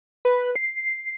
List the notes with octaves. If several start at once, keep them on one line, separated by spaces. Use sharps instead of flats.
B4
C7